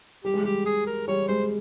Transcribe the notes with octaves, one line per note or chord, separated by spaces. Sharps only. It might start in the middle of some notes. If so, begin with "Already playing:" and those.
G3 G4
G#3
G3 G4
G#4
A#4
G3 C#5
G#3 C5